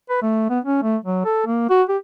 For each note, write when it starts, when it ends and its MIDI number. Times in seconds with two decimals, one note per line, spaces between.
0.10 0.19 71
0.22 0.47 57
0.50 0.59 59
0.65 0.81 61
0.83 0.97 57
1.04 1.22 54
1.25 1.42 69
1.46 1.69 58
1.70 1.83 66
1.89 1.97 67